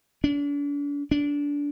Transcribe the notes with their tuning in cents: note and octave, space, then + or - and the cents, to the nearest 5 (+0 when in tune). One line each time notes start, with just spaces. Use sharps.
D4 -40
D4 -25